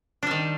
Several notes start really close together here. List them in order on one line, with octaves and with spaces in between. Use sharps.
D4 G3 D#3